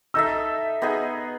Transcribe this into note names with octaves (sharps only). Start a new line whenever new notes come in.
D#4 A4 E5 E6
B3 D#4 G#4